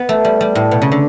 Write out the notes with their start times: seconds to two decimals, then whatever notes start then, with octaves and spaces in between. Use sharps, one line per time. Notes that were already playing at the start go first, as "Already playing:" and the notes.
Already playing: B3
0.09 A3
0.25 G3
0.41 G3
0.55 A2
0.71 B2
0.82 C#3
0.92 D3